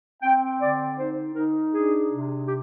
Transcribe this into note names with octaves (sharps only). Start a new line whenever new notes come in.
C4 G5
D3 D5
D#4 C5
D#4 A#4
D4 G#4
C3
G4